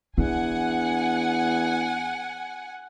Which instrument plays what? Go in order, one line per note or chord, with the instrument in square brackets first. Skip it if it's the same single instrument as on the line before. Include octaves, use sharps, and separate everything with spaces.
[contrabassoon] E2 [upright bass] D4 [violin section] F#5 G#5